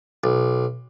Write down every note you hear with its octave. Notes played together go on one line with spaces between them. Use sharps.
B1